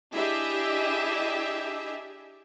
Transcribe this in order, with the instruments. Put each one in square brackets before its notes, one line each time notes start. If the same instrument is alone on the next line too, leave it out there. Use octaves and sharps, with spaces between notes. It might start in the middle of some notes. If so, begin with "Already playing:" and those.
[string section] D4 E4 G4 G#4 D#5 E5